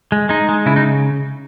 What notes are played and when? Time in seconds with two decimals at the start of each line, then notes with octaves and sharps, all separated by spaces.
0.12 G#3
0.29 G#3 D#4
0.49 G#3
0.66 C#3 E4
0.76 D#4